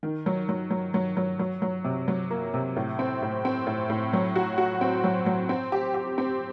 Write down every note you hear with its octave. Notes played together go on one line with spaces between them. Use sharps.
D#3
F#3
F#3
F#3
F#3
F#3
F#3
F#3
C3
F#3
A#3
C3
A2
C4
A2
C4
A2
A2
F#3
F#4
F#4
C4
F#3
F#3
C4
G4
G4
C4